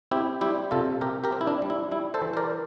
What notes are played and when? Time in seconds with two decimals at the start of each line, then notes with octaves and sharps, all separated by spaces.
0.11 C4 E4 G4
0.41 G3 E4 G4
0.71 C3 F4 A4
1.01 C3 G4 A#4
1.24 G4 A#4
1.32 C4
1.41 E4
1.47 D4
1.62 G3
1.70 E4
1.91 G3 E4
2.14 A4 C5
2.22 E3
2.33 C5
2.37 A#4 D5